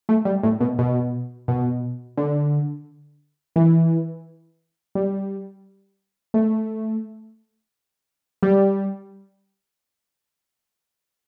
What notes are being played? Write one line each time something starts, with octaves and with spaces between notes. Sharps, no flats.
A3
G3
A2
B2
B2
B2
D3
E3
G3
A3
G3